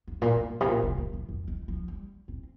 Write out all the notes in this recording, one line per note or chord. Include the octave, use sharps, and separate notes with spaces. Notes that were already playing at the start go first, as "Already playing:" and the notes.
G2
A#2
G2
C3
A#2
C3
D#3
F3
F2
D#3
F3
G3
C4